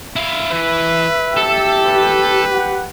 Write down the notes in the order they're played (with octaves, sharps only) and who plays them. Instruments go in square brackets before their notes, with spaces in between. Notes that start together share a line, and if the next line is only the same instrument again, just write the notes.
[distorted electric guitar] E4 F5 [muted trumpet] E5
[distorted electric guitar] E3 [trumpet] B4
[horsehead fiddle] G4 [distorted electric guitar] A4
[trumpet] B4
[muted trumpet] F#5